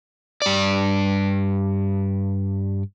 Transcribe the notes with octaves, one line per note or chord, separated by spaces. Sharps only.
G2 D5